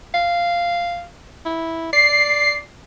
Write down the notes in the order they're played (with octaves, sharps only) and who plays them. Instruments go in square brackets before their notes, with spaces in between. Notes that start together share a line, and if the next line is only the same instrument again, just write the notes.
[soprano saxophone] F5
E4
[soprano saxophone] D5 [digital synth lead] C7